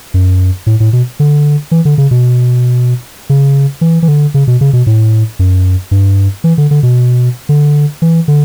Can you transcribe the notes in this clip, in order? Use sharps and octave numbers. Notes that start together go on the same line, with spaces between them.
F#2
A2
A2
B2
D3
E3
D3
C#3
B2
C#3
E3
E3
D3
C#3
B2
C#3
B2
A2
F#2
G2
E3
D3
D3
B2
D3
E3
D3